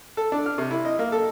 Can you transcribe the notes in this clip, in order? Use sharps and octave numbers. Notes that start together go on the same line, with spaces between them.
A4
D4
F6
C3
E4
D#5
A#3
A4